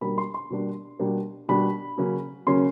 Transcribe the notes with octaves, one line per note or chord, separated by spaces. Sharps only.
B2 G3 A#3 D4 B5
C6
C6
B2 G3 A#3 D4
B2 G3 A#3 D4
B2 G3 A#3 D4 B5
C#3 F#3 A#3 C#4
C#3 F#3 A#3 C#4 C6